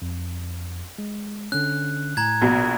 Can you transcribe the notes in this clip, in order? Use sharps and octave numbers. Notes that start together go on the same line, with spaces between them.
F2
G#3
D3 C#4 F#6
A2 G#5 A#5 G#6
A#1 B2